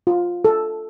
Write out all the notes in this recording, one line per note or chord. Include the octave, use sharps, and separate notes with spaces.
F4
A4